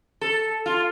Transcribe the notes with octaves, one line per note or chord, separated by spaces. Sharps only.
A4
F4